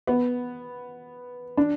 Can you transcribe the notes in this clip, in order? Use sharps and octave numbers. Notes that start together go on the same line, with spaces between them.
B3
D4